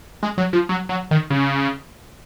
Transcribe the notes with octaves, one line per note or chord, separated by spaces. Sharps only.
G#3
F#3
F3
F#3
F#3
D#3
C#3